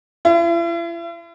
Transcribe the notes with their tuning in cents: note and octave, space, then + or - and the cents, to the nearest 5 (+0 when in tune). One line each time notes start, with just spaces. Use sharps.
E4 +45